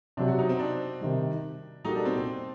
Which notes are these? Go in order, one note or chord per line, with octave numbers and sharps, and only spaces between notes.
C3 F#3 C4 D4 G4
F#4
D#4
C4
D4
C3 D#3 G3
A#2 G3 A#3 D#4 F#4 A4
D4
C4
C4